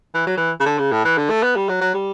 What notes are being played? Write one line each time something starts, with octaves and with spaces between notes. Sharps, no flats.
E3
F#3
E3
C#3
D3
C#3
A2
E3
D3
A3
B3
G3
F#3
F#3
G3